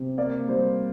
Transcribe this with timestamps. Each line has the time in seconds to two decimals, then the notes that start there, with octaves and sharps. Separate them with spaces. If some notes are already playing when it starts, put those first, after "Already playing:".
Already playing: C3
0.18 A#3 D5
0.49 G3 C5